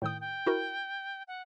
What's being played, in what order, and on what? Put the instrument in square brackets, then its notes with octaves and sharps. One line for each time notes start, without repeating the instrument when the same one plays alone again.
[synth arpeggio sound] A2 D#3 D#6 [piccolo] G5
[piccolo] G5
[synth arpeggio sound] E4 F#4 A#4
[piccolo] F#5